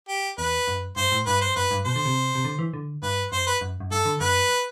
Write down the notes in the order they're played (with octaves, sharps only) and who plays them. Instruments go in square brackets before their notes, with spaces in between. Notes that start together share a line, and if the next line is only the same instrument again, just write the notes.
[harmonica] G4
[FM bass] E2 [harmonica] B4
[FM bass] F#2
[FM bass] G2 [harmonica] C5
[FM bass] A2
[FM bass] G2 [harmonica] B4
[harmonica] C5
[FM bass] F#2 [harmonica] B4
[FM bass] G2
[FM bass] B2 [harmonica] C5
[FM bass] D3
C3
C3
D3
E3
D3
[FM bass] G2 [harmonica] B4
[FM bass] F#2 [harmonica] C5
[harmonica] B4
[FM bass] F#2
F#2
[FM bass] G2 [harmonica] A4
[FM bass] D3
[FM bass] F#2 [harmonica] B4